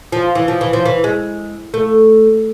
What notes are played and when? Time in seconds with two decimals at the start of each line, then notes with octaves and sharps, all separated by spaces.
0.12 F3
0.35 E3
0.48 F3
0.61 E3
0.73 F3
0.85 E3
1.04 G#3
1.74 A3